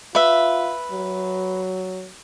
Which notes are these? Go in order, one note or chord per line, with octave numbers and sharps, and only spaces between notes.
F4 B4 E5
F#3